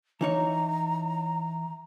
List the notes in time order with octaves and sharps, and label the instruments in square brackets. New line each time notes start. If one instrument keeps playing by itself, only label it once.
[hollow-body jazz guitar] E3 D#4 C#5 [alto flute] A#5